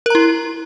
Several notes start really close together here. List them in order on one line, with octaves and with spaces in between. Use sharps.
A#4 A#5 E4